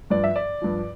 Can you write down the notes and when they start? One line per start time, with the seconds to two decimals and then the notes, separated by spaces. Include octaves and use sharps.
0.10 G2 F3 D5
0.24 E5
0.36 D5
0.62 G2 F3